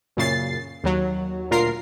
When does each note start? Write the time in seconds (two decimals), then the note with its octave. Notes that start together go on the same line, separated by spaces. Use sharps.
0.17 F#2 A#2 C#3 A6 C7
0.84 D#2 F#3
1.50 D2 A#2 F4 A#4 C7